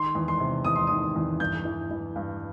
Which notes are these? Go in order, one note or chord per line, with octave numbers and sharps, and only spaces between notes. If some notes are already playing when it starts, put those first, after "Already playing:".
Already playing: D#3 C6
E2
C6
C3
E2 D#6
C6
D#3 D#6
E2
G2 G6
E3
E3
G2